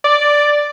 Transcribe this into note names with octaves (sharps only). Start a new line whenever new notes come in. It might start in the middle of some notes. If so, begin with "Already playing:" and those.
D5